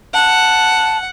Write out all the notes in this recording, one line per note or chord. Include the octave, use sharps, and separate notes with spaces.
F#5 A5